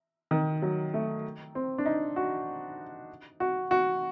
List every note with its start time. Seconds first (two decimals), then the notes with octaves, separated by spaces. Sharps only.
0.31 D#3
0.62 F#3
0.94 A3
1.55 C4
1.78 D4
1.86 D#4
2.16 F#4
3.40 F#4
3.71 F#4